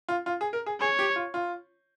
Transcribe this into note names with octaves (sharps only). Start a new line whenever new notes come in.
F4
F4
G#4
A#4
G#4
G#4 C#5
G4
F4
F4